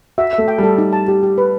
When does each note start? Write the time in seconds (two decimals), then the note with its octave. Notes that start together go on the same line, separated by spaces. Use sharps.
0.18 F#4 E5
0.33 E5
0.38 A3
0.48 G5
0.58 G3 A4
0.78 D#4
0.93 A5
1.08 G4
1.23 G4
1.38 B4